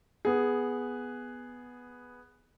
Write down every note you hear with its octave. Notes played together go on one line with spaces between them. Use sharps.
B3 G#4